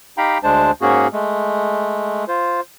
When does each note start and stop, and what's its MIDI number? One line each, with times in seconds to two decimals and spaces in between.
0.18 0.38 63
0.18 0.38 67
0.18 0.38 77
0.18 0.38 79
0.18 0.38 82
0.18 0.38 83
0.43 0.71 38
0.43 0.71 56
0.43 0.71 62
0.43 0.71 72
0.43 0.71 81
0.81 1.07 44
0.81 1.07 58
0.81 1.07 61
0.81 1.07 66
0.81 1.07 68
1.13 2.24 56
1.13 2.24 57
2.28 2.61 65
2.28 2.61 72